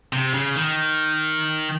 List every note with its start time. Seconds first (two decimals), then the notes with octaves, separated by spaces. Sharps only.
0.13 C3
0.34 C#3
0.56 D#3